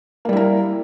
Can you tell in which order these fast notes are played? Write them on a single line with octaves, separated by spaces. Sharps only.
A#3 G3 E4 A#4